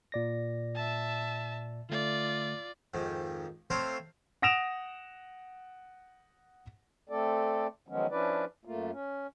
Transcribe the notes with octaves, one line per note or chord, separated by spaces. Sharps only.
A#2 D5 A#6
E5 A5
D3 A3 F4 D5
F2 G#2 D#3
A3 C4 C5 C#5 F5 G5
F#5 D#6 A#6 D7 E7 F7
A3 C4 A4 D5
D#3 F3 F#3 G#3 B3 C#4
F3 C#4 D4 E4 B4 D5
F#2 A3 A#3 F4
C#4